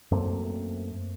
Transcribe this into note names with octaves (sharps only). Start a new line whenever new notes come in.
F#2 A3 A#3 C4